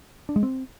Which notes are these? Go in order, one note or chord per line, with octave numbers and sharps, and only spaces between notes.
D4
G#3
C4